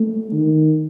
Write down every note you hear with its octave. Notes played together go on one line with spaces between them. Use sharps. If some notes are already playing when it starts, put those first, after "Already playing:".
Already playing: A3
D#3